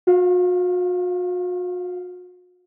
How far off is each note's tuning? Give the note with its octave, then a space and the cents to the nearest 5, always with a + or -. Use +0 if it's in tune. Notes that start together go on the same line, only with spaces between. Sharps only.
F#4 -40 F5 +0